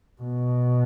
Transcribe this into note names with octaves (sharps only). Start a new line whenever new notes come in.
B2